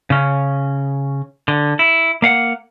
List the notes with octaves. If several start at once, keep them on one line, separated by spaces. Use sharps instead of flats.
C#3 C#4
D3
E4
A#3 F5 F#5